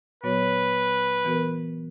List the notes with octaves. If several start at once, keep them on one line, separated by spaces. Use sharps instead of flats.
A#2 F#3 B3 F#4 B4 C#5
E3 B3 F#4 A#4